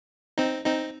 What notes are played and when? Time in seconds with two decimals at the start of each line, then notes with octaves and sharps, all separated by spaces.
0.38 C4 D#4
0.66 C4 D#4